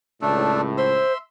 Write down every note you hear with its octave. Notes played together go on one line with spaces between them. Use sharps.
C#2 A2 A3 D4 A4
C5 E5 C6 E6